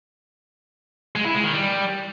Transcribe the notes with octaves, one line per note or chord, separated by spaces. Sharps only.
G#3
E4
G#3
D#3
G3